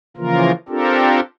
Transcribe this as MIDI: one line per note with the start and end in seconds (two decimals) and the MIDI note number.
0.17 0.52 49
0.17 0.52 52
0.17 0.52 53
0.17 0.52 58
0.17 0.52 65
0.17 0.52 70
0.69 1.20 60
0.69 1.20 62
0.69 1.20 65
0.69 1.20 67
0.69 1.20 69
0.69 1.20 70